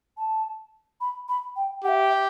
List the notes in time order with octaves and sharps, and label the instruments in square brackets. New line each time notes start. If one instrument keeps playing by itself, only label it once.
[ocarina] A5
B5
B5
G5
[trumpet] G4 [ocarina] F#5
[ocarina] E5